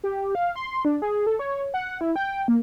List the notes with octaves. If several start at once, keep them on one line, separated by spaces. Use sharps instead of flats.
G4
F5
C6
D4
G#4
A4
C#5
F#5
E4
G5
A#3